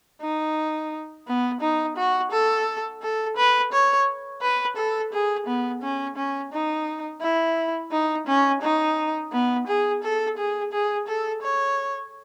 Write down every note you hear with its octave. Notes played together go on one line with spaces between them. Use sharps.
D#4
B3
D#4
F#4
A4
A4
B4
C#5
B4
A4
G#4
B3
C#4
C#4
D#4
E4
D#4
C#4
D#4
B3
G#4
A4
G#4
G#4
A4
C#5